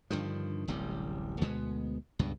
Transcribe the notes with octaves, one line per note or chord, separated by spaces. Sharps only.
G2 D3 D#3 F3
D1 A1 C3 G3
D2 B2 G#3 B3
C#2 G2 B2